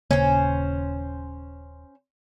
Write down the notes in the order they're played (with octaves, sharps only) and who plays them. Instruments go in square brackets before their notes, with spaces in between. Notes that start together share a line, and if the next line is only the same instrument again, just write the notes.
[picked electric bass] D#1 C#3 A#3 [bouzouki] C#4 C5